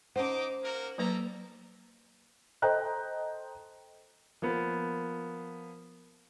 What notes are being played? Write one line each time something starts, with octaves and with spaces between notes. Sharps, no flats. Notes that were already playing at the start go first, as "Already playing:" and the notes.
C#4 D#4 C5 F#5 D6
A#3 F#4 A#4
F#3 G3 A#3 A4 B4 A#5
A4 C5 D#5 G5 A#5 F#6
F3 A#3 B3